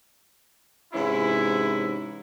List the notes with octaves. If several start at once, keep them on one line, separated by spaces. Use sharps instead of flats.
G#2 C3 E3 C#4 E4